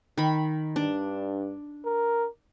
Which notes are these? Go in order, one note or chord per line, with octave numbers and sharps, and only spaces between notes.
D#3 B5
G2 D4
A#4